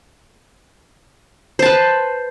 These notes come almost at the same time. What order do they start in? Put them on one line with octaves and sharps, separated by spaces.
C5 A5 B4